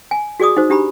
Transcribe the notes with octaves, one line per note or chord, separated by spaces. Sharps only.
G#5
F#4 G#4 D5 D6 D#6
D#4 F#4 C5
D4 G4 A#5 B5